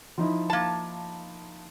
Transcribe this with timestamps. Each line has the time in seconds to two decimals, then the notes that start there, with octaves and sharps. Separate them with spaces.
0.18 F3 D#4 E4
0.50 A#3 A5